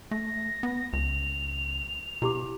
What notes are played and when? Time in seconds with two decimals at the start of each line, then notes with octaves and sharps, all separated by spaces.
0.11 A3 A#6
0.63 B3
0.93 C#2 F7
2.22 B2 E4 G4 D6